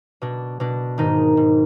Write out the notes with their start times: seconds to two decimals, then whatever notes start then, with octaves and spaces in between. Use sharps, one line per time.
0.22 B2 D4
0.60 B2 D4
0.98 G#2 D#3 D#4
1.37 G#2